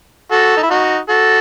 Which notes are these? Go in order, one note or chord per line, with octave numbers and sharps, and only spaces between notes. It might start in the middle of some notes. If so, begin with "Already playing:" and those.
F#4 A4
D#4
E4
D#4 F#4
F#4 A4